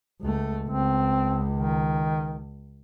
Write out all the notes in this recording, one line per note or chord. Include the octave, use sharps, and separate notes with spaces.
C#2 A3
C#2 C4
D#3